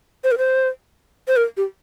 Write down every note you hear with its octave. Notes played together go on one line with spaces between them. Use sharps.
C5
A#4
C5
C5
A#4
G4